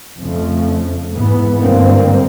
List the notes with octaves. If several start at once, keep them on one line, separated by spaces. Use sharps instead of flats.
F2 C#3 F3 A3
G#2 E3 B3
G2 D3 G#3 A#3 C4